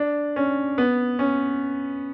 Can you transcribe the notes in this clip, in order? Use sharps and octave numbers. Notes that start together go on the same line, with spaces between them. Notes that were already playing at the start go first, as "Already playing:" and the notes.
Already playing: D4
C#4
B3
C#4